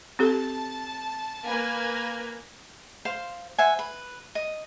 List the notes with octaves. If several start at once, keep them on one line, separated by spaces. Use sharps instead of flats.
C4 G4 A4 A5
A#3 B4 G#5
C5 F5 C6
C5 E5 F#5 G#5
B4
D#5